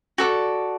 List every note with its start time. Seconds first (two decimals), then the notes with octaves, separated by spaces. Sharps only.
0.18 F#4 A4 D5